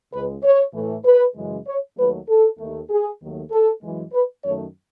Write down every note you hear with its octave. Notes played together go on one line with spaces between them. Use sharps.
C#2 C#3 G#3 B4
C#5
A2 E3 A3
B4
F#2 C#3 E3 G#3
C#5
D#2 D#3 F#3 A3 B4
A4
D#2 D#3 A3
G#4
D#2 D#3 F#3 A3
A4
F#2 E3 G#3
B4
F#2 D#3 A3 C#5